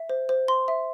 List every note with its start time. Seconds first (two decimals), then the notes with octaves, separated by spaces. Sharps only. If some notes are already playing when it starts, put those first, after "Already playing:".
Already playing: E5
0.09 C5
0.29 C5
0.48 C6
0.68 E5